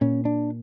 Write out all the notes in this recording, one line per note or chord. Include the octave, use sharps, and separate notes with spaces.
A#2 C#4
D4